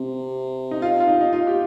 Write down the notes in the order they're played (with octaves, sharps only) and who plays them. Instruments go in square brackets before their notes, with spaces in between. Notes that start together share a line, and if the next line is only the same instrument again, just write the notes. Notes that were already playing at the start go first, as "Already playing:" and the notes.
Already playing: [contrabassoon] C3
[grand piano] D#4
F4
F4
D#4
D#4
F4
G4